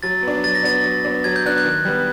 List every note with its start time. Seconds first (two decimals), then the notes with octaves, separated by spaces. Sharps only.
0.03 F#3 A6
0.23 B3 D4
0.44 F#3 A6
0.55 A#6
0.63 B3 D4 A6
0.84 F#3
1.05 B3 D4
1.24 F#3 G#6
1.36 G6
1.45 B3 D4 F#6
1.58 G6
1.65 D#3
1.85 G3 B3